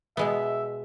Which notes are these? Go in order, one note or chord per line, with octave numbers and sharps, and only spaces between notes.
B2 G#3 B3 E5